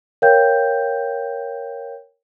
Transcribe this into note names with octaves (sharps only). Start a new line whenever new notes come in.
A#4 C#5 F5 G5 G6